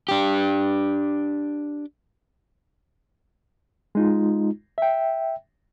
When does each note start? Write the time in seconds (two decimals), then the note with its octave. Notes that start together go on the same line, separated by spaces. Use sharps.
0.09 D4 G4
3.95 G#3 D#4 F4
4.78 E5 G5